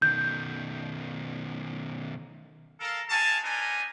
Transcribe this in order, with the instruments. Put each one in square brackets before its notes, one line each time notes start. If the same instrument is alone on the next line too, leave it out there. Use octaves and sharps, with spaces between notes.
[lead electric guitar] B2 D#3 [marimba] G6
[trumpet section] A4 A#4 F5
G#3 F#4 F5 G#5 A5
C4 D4 D#4 A#4 B4 G#5